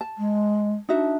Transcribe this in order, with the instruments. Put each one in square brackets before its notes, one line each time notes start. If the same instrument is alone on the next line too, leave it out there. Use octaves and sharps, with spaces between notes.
[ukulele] A5
[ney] G#3
[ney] D4 [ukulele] D#4 F#4 E5